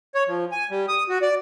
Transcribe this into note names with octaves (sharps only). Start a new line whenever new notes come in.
C#5
F3
G#5
G3
D#6
F#4
D5